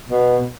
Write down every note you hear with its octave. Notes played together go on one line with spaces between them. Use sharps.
B2